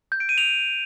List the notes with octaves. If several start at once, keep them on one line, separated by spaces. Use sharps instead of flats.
G6
D7
D#7
F7